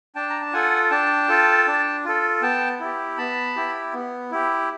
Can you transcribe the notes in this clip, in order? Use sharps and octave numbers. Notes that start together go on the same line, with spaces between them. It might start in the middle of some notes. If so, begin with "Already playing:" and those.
D4 G5 A5
A#5
A5
F4 A4 F#5 G#5
D4 G5 A5
F4 A4
D4
F4 A4
B3 G5 A5
E4 G4
B3 A5 B5
E4 G4
B3
E4 G4